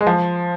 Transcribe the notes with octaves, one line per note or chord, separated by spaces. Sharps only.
G#3
F3